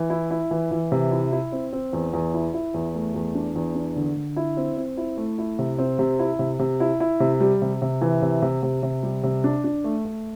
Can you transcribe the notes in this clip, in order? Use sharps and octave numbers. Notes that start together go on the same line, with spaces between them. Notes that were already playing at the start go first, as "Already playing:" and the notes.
Already playing: E3
E4
E4
E3
E3
C3
E4
E4
C4
C4
E2
E2
E4
E4
E2
A3
E2
D4
E2
D4
D3
D3
E4
C4
C4
E4
A3
E4
C3
C4
C3
E4
C3
C3
E4
E4
C3
G3
C3
C3
E3
C3
C3
C3
C3
G3
C3
D4
D4
A3
A3